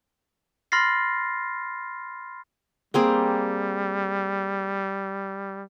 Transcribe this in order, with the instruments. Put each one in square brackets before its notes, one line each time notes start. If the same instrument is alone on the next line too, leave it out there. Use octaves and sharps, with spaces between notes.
[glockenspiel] B5 C6 F6 A6 A#6 C7
[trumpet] G3 [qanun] A#3 C4 G#4